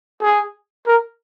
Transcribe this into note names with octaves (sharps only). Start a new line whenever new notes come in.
G#4
A#4